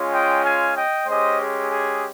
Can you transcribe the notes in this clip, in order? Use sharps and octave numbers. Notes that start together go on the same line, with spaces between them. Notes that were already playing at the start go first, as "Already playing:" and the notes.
Already playing: G#3 C#4 F4
D#5 G5
F5 G#5
D#5 G5
G#3 C#4 G4 C5 D#5
G#4
G#4